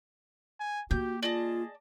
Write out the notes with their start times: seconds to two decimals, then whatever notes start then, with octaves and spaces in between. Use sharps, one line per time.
0.60 G#5
0.91 A#3 F#4 G4 G6
1.23 F4 G#4 D5 D#5 A5